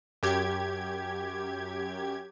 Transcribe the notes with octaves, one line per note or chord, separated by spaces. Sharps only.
F#2 G4 G#6